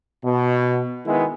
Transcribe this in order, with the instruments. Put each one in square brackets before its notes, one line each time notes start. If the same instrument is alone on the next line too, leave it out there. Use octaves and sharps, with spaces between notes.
[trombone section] B2
D#3 G#3 B3 E4